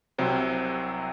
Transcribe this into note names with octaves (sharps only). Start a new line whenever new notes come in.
C2 C3 F#3 C4